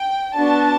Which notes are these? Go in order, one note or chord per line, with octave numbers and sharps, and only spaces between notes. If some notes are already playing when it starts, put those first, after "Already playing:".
Already playing: G5
B3 D4 F#4 A5